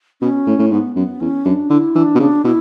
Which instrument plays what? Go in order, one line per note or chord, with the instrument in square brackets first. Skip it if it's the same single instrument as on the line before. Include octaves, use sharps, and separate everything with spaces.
[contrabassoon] B2 [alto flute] C#4
[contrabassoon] A2
A2
[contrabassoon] G#2 [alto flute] B3
[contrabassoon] F#2 [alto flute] B3
[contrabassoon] E2 [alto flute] C#4
[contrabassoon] F#2 [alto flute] D4
[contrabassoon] D3 [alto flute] E4
[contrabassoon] E3 [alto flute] D4
[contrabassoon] B2
[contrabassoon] C#3 [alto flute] D4
[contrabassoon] B2 [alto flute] E4